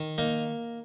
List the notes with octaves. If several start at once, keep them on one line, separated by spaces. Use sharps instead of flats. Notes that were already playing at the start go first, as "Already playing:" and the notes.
Already playing: D#3
A#3 D#4